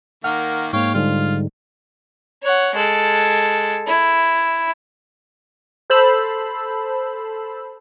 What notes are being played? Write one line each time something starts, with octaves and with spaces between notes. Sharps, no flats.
D#3 A#3 F#5 F6
G#2 A#3 C#5 F5 G5
G#2 D3 G3 F4
C#5 F#5
G#3 A4
E4
A4 C5 A5 B5 E6